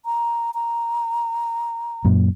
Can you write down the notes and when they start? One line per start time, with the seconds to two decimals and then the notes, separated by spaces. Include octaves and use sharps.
0.05 A#5
0.54 A#5
2.05 F#2 A#2